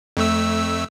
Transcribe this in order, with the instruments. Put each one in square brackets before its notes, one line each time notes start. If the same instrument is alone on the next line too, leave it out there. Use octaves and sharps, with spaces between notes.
[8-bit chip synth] F2 A3 E6